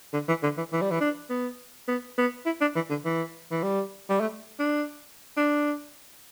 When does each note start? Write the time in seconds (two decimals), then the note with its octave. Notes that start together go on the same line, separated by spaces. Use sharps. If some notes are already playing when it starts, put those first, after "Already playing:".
0.14 D3
0.28 E3
0.43 D3
0.58 E3
0.73 E3
0.82 G3
0.91 E3
1.00 D4
1.30 B3
1.88 B3
2.18 B3
2.46 E4
2.61 D4
2.75 E3
2.90 D3
3.05 E3
3.51 E3
3.63 G3
4.09 G3
4.21 A3
4.59 D4
5.37 D4